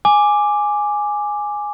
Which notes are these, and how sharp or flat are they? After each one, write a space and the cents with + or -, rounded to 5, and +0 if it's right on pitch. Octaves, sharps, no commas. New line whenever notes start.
G#5 +0 D6 +0